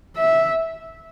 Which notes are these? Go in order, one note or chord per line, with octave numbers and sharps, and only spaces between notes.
E5